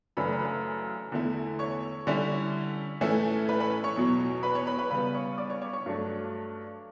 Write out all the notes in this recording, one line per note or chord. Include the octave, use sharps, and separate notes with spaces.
F#2 C#3 E3 A3 D4 B4 B5
B4 B5
E2 D3 A3 E4
C#5 C#6
D3 G3 C#4 E4
A2 E3 A3 C#4 E4
B4 B5
B4 B5
C#5 C#6
E2 B2 F#3
B4 B5
C#5 C#6
B4 B5
B4 B5
C#3 G3 B3 B4 B5
C#5 C#6
D5 D6
C#5 C#6
C#5 C#6
C#5 C#6
G2 F#3 A3 D4